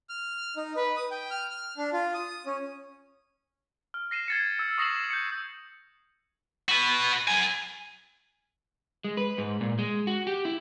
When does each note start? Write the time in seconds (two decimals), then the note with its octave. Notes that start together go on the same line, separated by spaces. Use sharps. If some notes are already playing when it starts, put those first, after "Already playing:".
0.09 F6
0.56 D#4
0.76 B4
0.97 D#6
1.11 G5
1.31 F6
1.50 F6
1.77 D4
1.93 F4
2.14 D#6
2.46 C#4
3.94 F6
4.11 A#6 C7 D#7 E7
4.28 G#6 A6 C#7
4.59 E6
4.78 C#6 D#6 A#6 C7 E7 F#7
5.10 G6 C#7
6.69 F#4 B4
7.28 F#3 G#5
9.04 G#3
9.17 B4
9.38 G#2
9.61 A#2
9.79 G#3
10.07 F#4
10.27 G4
10.45 E4